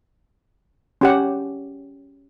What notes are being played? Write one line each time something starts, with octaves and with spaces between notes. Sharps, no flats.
C#4 G4 F#5